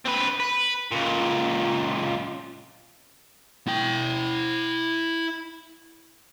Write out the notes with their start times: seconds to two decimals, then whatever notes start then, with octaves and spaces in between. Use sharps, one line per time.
0.05 C4 B4
0.40 B4
0.91 C#2 A#2
3.68 E4 G5